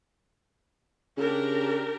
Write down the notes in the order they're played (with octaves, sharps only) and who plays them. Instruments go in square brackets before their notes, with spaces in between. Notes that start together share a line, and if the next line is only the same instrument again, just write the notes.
[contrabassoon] C#3 [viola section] D4 G4 A#4